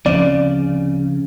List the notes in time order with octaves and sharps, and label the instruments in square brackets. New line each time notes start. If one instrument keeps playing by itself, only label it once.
[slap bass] D2 F3 C4 [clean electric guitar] C#3 [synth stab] D5